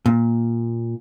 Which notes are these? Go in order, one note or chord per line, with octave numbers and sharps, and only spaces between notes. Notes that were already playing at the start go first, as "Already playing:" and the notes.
A#2